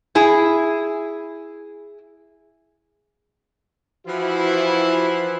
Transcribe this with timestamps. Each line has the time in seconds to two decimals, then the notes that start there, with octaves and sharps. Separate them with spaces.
0.15 E4 G#4
4.07 E3 F3 E4 F#4